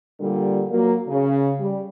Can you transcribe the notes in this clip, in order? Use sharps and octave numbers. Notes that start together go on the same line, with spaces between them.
A#2 D3 G3
F#3 A#3
C#3
G3